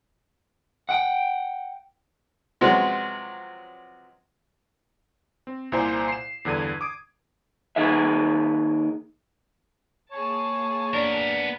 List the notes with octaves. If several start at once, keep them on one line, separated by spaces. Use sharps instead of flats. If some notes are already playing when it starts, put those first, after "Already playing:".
F#5 G5
C3 F3 F#3 G#3 B3 C#4
C4
C2 A#2 E4 C5 G#5 A#5
C7 E7
E2 G2 D3 G#6 D#7
D6 D#6 D7
D#2 D#3 G#4 E5
A#3 G#4 C#5 A5
B3 D4 A#4